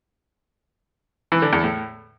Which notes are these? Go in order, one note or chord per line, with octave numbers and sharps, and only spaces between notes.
E3
D3
E2
A2